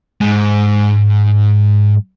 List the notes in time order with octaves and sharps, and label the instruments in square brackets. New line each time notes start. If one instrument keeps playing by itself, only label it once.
[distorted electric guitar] G#2 G#3